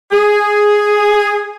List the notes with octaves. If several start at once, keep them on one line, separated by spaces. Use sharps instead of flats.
G#4